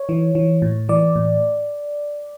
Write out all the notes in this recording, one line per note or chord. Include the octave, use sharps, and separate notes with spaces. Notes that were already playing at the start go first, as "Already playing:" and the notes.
Already playing: C#5
E3
E3
A2
E3 D5
A2